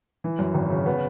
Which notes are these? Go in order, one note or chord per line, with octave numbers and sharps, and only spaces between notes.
E3
F#2
G#1
C#3
B3